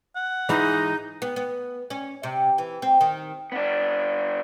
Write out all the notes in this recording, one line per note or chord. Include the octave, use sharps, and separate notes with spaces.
F#5
G#2 E3 G#3 D#4
B3
B3
C#4
C3
E3
C4
D#3
B3 D4